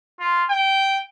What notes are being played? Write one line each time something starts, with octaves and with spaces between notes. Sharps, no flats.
F4
G5